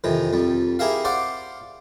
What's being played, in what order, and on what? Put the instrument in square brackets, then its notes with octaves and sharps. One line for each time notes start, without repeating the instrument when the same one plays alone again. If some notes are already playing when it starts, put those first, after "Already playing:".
[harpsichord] F2 C3 D#3 E3
F2 G3
E4 G4 G#4 A#4 E5 F5
C5 D5 F5 F#5 D6